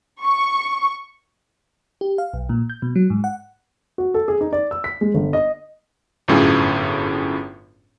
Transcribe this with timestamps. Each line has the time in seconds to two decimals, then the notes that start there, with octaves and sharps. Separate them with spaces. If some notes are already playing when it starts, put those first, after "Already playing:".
0.24 C#6
2.01 G4
2.18 F5
2.34 B1
2.49 A#2
2.70 G6
2.82 B2
2.96 F#3
3.10 G#2
3.24 F#5
3.98 F#4
4.14 A4
4.28 G#4
4.41 D#4
4.53 D5
4.71 E6
4.84 B6
5.01 G#3
5.14 G1
5.33 D#5
6.28 G1 F#2 A2 C#4 F4 G#4